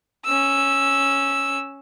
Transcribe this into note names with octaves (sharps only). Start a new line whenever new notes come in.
C#4 E6